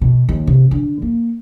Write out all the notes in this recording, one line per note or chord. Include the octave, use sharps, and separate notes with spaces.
B2
D#2
C3
D3
A#3